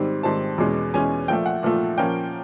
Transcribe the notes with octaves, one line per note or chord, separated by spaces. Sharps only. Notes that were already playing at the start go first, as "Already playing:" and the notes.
Already playing: G#2 D#3 G3 C4
G#2 D#3 G3 C4 A5
E2 B2 G#3 C#4
E2 B2 G#3 C#4 G#5
A#2 F3 A3 G5
F#5
A#2 F3 A3
A#2 F3 A#3 C#4 G5